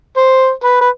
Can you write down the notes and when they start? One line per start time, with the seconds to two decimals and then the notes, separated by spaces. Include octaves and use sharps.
0.17 C5
0.64 B4
0.81 B4